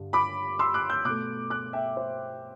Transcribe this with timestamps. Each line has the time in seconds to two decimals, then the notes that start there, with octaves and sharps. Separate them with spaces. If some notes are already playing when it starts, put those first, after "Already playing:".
Already playing: G2 D3
0.13 B5 D6
0.59 C6 E6
0.74 D6 F#6
0.90 E6 G6
1.05 B2 A3 D6 F#6
1.50 D6 F#6
1.73 E5 G5
1.96 C5 E5